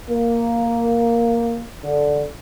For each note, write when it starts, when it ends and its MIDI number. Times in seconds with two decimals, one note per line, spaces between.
0.10 1.62 58
1.84 2.23 50